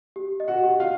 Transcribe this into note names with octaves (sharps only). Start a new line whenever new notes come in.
G4
D#5
F#4 F#5
G4
F4 F5